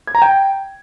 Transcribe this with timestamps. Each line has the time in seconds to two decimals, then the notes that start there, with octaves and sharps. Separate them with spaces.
0.07 G#6
0.15 A#5
0.22 G5